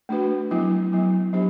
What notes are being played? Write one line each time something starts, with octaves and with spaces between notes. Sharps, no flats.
A3 D4 F#4 B4
F#3 B3 E4
F#3 B3 E4
F#3 B3 D4 G4 C5